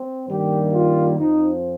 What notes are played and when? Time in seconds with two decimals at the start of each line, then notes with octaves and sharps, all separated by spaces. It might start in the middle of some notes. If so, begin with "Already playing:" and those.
Already playing: C4
0.29 G2 D#3 G3 A#3 G4
0.72 F4
1.18 F2 F3 C4 D#4